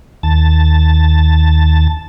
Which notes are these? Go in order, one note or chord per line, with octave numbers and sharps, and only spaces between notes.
D#2 A5